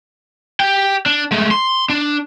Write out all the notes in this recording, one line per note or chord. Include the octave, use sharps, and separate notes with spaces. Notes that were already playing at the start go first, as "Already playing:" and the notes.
G4 G5
D4
G#3 A3
C6
D4